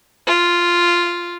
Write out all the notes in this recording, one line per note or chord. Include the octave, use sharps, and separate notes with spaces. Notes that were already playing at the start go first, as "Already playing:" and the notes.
F4